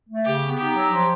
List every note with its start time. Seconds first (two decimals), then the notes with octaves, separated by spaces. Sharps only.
0.09 A3
0.25 C#3 G4
0.42 B3
0.58 D#4 G4
0.75 F#3
0.92 F3